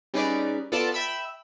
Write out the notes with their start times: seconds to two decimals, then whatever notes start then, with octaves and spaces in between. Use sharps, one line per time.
0.14 G3 C#4 D#4 G#4 B4 D5
0.72 B3 F4 A4 D5 A5
0.94 E5 G5 B5 E6